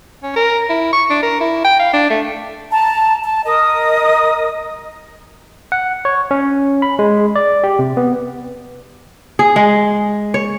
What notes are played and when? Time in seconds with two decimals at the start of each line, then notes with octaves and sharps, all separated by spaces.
0.23 C#4
0.36 A#4
0.69 E4
0.93 C#6
1.10 D4
1.22 A#4
1.40 E4
1.64 G5
1.80 F5
1.93 D4
2.10 A3
2.71 A5 A#5
3.24 A5
3.45 A#4 D#5 D#6
5.72 F#5
6.05 C#5
6.31 C#4
6.82 B5
6.99 G#3
7.36 D5
7.64 G4
7.79 C3
7.97 B3
9.39 G#4
9.56 G#3
10.34 C#5